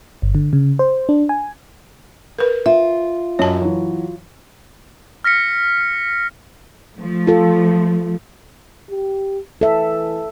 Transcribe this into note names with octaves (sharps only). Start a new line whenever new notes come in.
G1
D3
C#3
C5
D4
G#5
A#4 B4
F4 E5
F#2 C#5 D#5 A5
E3 F#3
F6 A#6 B6 C#7
F3 A3
F4 A4
G4
E3 A4 E5